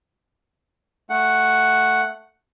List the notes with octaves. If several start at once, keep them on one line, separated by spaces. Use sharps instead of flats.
A3 F#5